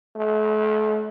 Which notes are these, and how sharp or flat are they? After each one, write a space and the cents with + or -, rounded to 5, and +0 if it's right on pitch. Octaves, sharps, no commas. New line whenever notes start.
A3 -40